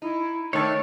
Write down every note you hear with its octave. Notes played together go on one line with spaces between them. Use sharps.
D#4 E4
D#3 A3 D4 C#5 A5